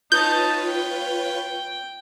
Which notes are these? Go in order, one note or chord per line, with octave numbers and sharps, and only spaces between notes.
D#4 F4 B4 C#5 A5 G6
G5